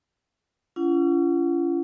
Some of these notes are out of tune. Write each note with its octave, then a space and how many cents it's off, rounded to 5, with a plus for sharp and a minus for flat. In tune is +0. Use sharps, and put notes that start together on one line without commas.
C#4 +35 F4 -40 F#5 +0